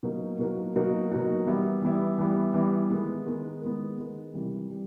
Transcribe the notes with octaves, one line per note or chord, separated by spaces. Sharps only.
B2 F#3 A#3 D#4 F#4
B2 F#3 A#3 D#4 F#4
B2 F#3 A#3 D#4 F#4
B2 F#3 A#3 D#4 F#4
E3 G3 B3 E4
E3 G3 B3 E4
E3 G3 B3 E4
E3 G3 B3 E4
D#3 G#3 B3
D#3 G#3 B3
D#3 G#3 B3
D#3 G#3 B3
C3 E3 G3
G3